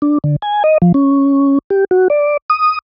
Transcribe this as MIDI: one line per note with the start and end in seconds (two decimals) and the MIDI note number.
0.02 0.18 62
0.24 0.36 50
0.42 0.63 80
0.64 0.78 75
0.82 0.92 53
0.94 1.58 61
1.70 1.84 67
1.91 2.08 66
2.10 2.37 74
2.50 2.79 87